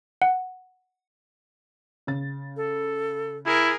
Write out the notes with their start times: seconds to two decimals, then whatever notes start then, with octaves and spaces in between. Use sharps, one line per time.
0.22 F#5
2.07 C#3 A6
2.57 A4
3.46 E4 G#4 A#4